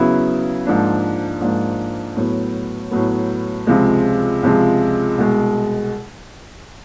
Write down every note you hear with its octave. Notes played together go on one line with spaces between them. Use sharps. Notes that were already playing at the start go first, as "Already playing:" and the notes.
Already playing: C#3 F#3 B3 E4
G#2 F3 A#3 D4
G#2 F3 A#3 D4
A2 F#3 B3
A2 F#3 B3
C#2 C3 F3 G#3
C#2 C3 F3 G#3
C2 B2 G#3